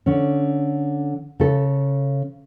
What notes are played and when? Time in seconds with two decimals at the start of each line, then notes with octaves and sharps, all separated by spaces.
0.06 D3 C#4
1.40 C#3 A4